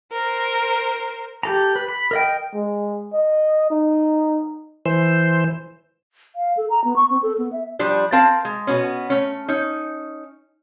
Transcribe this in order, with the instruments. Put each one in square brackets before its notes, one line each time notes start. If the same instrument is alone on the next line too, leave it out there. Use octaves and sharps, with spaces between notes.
[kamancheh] A#4 C5
[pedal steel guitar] G4 A4 A#5
B4
B5
A#4 D#5 G5
[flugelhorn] G#3
D#5
D#4
[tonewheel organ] E3 C5
[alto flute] F5
A4
A#5
B3
C#6
C4
A4
B3
E5
[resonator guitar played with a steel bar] F3 G3 D4
C4 A#4 F5 A5
G#3
B2 B3 C#4
A3 C#4
C#4 D#4